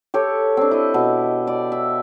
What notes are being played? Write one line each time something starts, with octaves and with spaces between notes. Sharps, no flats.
G4 A4 C#5
C4 D4
E4 D#5
B2
D5
E5